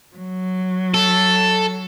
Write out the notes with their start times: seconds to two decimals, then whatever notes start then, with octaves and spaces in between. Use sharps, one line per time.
0.16 F#3
0.94 A4